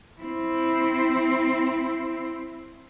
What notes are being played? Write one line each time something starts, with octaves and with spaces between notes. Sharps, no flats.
C4 E4